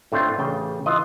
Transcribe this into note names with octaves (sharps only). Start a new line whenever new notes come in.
A2 A3 C4 D4 F4
A1 C#3 G5
E3 F4 D#5